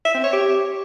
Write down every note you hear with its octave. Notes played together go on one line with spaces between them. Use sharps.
E5
C4
C#5
G4